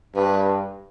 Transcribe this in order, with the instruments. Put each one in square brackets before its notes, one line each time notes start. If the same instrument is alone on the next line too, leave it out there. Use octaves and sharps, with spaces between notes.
[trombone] G2 [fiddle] B4